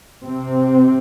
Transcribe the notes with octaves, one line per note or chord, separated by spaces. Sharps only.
C3 C4